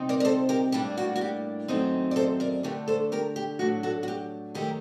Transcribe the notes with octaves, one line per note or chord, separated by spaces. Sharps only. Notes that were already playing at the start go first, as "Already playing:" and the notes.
Already playing: C3 G3 C4 D#4
A#4 D5
A#4
A4 C5
G4 A#4
A2 G3 A#3 D4 G4
F#4
F#4
G4
F#2 D#3 A3 C4 D#4
D5
A4 C5
A#4 D5
D3 A3 D4 G4 A#4
A4 C5
G4 A#4
G4
A2 F#3 A3 D4 F#4
F#4 A4
F#4
G4
F#2 D#3 A3 G4 A#4